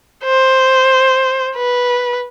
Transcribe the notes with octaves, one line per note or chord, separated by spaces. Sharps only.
C5
B4